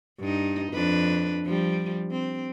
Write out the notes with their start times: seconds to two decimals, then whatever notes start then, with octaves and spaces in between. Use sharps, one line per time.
0.19 G2 D#4
0.73 F2 D4 B4
1.44 F3 G3
2.11 C4